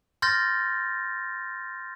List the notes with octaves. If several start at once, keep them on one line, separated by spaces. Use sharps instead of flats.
C6 F6 G6 A6 A#6